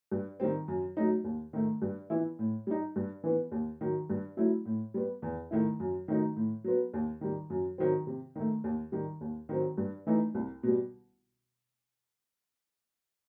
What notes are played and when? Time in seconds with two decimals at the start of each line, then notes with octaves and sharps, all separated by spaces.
0.12 G2
0.40 D#3 G3 C4
0.68 F#2
0.97 F#3 A3 D#4
1.24 D#2
1.53 D#3 A3
1.82 G2
2.10 E3 B3 E4
2.39 A2
2.67 G3 D#4
2.96 G2
3.24 E3 B3
3.52 D#2
3.81 D#3 F#3
4.10 G2
4.37 F#3 A3 E4
4.65 A2
4.94 G3 B3
5.22 E2
5.51 D#3 A3 E4
5.80 F#2
6.08 D#3 F#3 A3 D#4
6.36 A2
6.64 F#3 B3
6.94 D#2
7.21 D#3 G3
7.50 F#2
7.78 D#3 F#3 C4
8.07 C3
8.36 D#3 A3
8.64 D#2
8.92 D#3 G3
9.21 D#2
9.49 D#3 F#3 C4
9.78 G2
10.07 E3 A3 D#4
10.35 C2
10.63 B2 G3